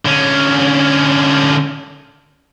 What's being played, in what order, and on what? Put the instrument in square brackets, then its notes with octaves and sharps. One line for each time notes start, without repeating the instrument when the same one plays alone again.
[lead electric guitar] D3 C#4